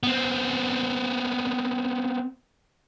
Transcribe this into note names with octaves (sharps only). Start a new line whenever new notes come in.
B3 C4